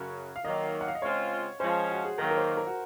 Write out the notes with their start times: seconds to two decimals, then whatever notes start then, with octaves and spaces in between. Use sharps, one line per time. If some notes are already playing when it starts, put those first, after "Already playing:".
Already playing: F#2 C#3 F#3
0.36 F5
0.45 D#3 F#3 A#3 D#5
0.81 F#5
0.88 F5
0.95 D#5
1.02 C#3 G#3 C4 F4 C#5
1.60 F3 G#3 C#4 C5
1.91 F#4
2.05 G#4
2.18 D#3 F#3 A#3 A#4
2.31 A#4
2.37 C5
2.57 A#4
2.67 F#4